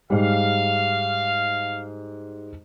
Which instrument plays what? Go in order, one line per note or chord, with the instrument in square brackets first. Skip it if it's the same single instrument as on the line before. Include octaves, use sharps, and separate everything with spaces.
[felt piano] G#2 G3 [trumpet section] F5